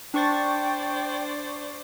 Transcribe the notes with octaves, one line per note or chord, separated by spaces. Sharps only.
D4 C5 D5 G5 C#6 A6